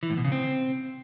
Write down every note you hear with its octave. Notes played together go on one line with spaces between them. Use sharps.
E3
A2
B2
C#3
C4